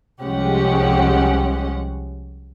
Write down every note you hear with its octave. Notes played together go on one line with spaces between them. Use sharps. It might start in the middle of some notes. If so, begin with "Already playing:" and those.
C2 F3 G#3 C#4 G4 F#5